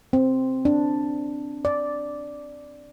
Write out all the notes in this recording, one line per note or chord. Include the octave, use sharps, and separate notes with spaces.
C4
D4
D5